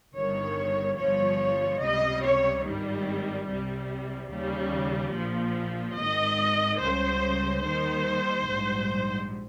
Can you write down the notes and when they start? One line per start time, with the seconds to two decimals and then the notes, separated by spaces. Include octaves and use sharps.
0.14 G1 G2 D#3 C#5
0.98 G1 G2 F3 C#5
1.81 C#2 C3 G3 D#5
2.23 C#5
2.64 G#1 G2 D#3 G3
3.48 C2 C3 G3
4.31 D#2 C#3 G3
5.14 A#1 A#2 F3
5.97 G#1 G#2 D#3 D#5
6.80 C#2 C#3 G3 C5
7.64 D#2 D#3 G3 C5
8.48 A#1 G#2 G3